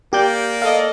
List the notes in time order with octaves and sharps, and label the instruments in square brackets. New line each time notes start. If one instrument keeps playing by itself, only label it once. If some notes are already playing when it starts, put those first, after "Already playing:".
[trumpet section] A#3 D5 [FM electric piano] G4 G6
[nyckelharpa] A4 D#5 [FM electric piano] F5